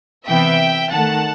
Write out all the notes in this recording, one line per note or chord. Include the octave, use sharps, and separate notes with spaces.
C3 E3 B3 E5 G5
D#3 A3 F#5 A5